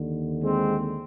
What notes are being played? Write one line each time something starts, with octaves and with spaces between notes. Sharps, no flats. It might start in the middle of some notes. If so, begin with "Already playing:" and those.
Already playing: D#2 D3
G#3 C4